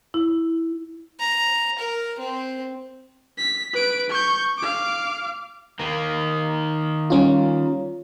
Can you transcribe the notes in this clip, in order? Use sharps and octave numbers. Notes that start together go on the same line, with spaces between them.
E4
A#5
A#4
C4
B6
B4 D7
C#6 G6
F5 D6
D#3 A#3
G3 C#4 F4